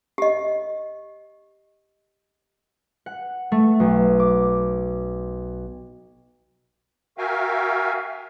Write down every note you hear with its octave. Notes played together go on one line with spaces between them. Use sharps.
G4 D#5
F#5
A3
B1
D6
F#4 A#4 E5 F5 G5 G#5